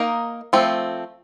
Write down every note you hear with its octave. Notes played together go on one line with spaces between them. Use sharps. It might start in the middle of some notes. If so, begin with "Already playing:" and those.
Already playing: A#3 D#4 A#4 D#5
F3 A3 C4